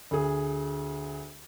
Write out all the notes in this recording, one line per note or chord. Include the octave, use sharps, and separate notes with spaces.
D2 G#4